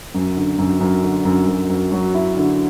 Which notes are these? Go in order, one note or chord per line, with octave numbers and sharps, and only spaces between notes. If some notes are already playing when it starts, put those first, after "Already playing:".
F#2
D3
F#2
F#2
D3
F#2
F#2
F#2
F#3
E4
D3